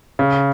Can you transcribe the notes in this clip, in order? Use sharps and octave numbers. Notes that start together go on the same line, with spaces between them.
C#3